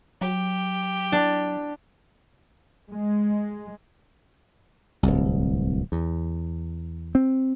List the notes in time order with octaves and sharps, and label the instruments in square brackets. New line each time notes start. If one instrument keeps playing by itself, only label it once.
[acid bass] F#3 [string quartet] G4
[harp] D4
[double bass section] G#3
[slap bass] D1 C2
E2
C4